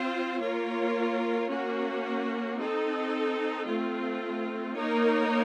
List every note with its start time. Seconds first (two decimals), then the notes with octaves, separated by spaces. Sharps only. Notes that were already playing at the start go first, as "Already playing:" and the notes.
Already playing: C4 F4 C5
0.40 A#3 F4 A#4 C#5
1.49 A#3 C#4 F#4
2.58 C4 D#4 A4
3.67 A3 C4 F4
4.75 A#3 D#4 A#4 C#5